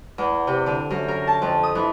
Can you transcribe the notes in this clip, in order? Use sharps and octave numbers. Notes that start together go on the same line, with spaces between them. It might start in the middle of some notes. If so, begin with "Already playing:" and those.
E2
C3
D3
F#2
A#4
A5
F2
D#6
E3